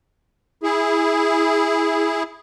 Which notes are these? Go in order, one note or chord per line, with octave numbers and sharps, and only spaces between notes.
E4 G#4